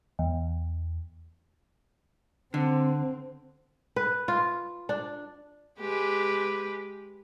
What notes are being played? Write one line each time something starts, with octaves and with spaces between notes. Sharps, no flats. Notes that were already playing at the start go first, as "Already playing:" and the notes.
E2
D3 C4
B4
F4
D4
G#3 G4 B4